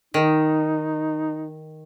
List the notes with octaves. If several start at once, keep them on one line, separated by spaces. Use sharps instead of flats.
D#3 D#4